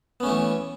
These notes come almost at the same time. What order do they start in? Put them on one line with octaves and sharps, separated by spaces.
B3 C#4 A3 E3